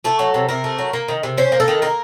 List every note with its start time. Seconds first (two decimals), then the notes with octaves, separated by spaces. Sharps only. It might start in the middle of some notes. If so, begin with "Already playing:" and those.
0.04 A3 A4
0.19 F#3
0.34 C3
0.49 C3 A#4
0.64 A3
0.78 F#3
0.93 A#3
1.08 D#3
1.23 C3
1.38 C#4 C5
1.52 A#3
1.60 A4
1.68 D#3
1.82 A#3 A#4